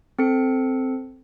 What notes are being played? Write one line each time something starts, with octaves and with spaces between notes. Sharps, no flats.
C4 A4 C#7